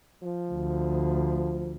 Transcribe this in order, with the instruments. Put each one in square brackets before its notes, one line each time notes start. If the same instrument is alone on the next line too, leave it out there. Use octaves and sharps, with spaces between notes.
[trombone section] F3
[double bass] D2